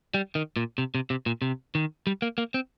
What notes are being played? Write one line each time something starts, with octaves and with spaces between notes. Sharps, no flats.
G3
D#3
A#2
C3
C3
C3
A#2
C3
D#3
G3
A#3
A#3
C4